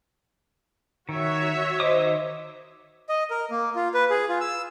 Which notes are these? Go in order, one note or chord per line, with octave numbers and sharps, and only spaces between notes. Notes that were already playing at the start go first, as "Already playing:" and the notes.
D#3 F#4 C#5 E5
D#3 C5 D#5 D6 D#6
D#5
A#4
A#3
F4
B4
G#4
F4
E6